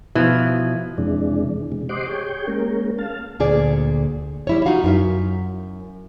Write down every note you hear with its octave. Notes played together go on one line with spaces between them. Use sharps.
B2 E3 F3
F2 C3 E3 G#3 D4
C3 G#3
G4 C5 D#5 F#5 C6 D6
G4 G#4 C#5 G5
G#3 A#3 C#4 A#4
F5 A5
D2 A#2 G#4 D5
G3 E4 C#5
D#4 F4 F#4 F5
F#2 A#4 E5